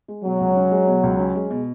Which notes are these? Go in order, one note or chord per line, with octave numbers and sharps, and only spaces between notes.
G#3
B2 F#3
C#2
C#4
G#3
B2
C#2
C#4
G#3
B2